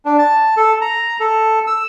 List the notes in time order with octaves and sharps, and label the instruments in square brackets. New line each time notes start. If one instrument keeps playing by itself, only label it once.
[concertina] D4
A5
A4
A#5
A4
E6